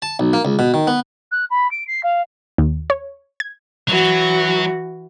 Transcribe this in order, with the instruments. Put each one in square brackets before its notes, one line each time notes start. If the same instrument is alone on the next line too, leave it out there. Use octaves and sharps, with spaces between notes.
[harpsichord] A5
B1
A#3
C#2
B2
D#3
B3
[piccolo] F#6
B5
D7
C7
F5
[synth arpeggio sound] D#2
C#5
G#6
[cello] E3 F#4 [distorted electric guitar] F#3